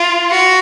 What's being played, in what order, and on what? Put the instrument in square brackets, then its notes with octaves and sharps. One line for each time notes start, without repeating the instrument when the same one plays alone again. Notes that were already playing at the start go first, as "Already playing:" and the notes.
Already playing: [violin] F4
F#4